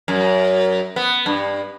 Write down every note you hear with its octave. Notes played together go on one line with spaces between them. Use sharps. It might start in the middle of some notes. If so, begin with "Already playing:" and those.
F#2
B3
G2